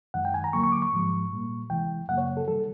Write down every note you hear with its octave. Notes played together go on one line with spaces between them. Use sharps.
F#2 D#3 G#3 F#5
G5
G#5
A#5
D2 D3 F#3 A#3 C#6
C#6
D6
C#6
G#2 F3 G#3
A#2 G3 A#3
D2 C3 E3 G#3 G5
F#2 C#3 F#3 A#3 F#5
C#5
A4
C3 D#3 G3 A4